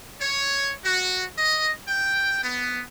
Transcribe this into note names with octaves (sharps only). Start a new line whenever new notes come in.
C#5
F#4
D#5
G5
B3